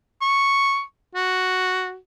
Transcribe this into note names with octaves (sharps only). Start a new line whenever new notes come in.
C#6
F#4